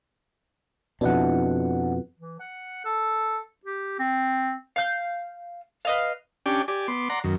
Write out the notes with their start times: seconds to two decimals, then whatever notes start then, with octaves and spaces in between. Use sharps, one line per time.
1.01 F2 B2 D4 E4 F#5
2.19 E3
2.40 F#5
2.85 A4
3.66 G4
3.99 C4
4.76 F5 G6
5.85 B4 D#5 F5
6.46 C#4 D4 G4 D5 G5 G#5
6.68 G4 D5 G#5
6.88 B3 C6 D6
7.10 D5 F#5 A#5 C6
7.24 F#2 D#3